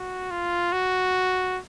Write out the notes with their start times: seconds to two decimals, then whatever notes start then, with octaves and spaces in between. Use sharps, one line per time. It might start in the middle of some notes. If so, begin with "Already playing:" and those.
Already playing: F#4
0.31 F4
0.72 F#4